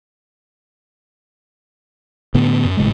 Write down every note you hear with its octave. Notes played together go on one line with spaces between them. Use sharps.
A2 D3 B3
F#2
G#1 A2 C#3 G#3